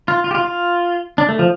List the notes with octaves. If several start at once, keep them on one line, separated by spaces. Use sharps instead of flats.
F4
F4
G4
F4
F4
D4
A3
F3